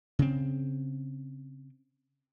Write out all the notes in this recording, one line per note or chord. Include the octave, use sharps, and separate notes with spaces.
C#3 C4